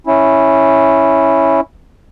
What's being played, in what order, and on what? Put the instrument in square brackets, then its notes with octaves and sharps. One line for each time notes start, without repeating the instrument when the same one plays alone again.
[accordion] C#4 E4